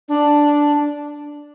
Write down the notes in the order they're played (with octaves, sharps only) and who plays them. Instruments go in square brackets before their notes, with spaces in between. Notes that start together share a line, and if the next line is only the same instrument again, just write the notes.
[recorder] D4